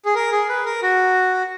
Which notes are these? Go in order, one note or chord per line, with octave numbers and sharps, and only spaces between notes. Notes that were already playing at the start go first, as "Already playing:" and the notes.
G#4
A#4
G#4
B4
A#4
F#4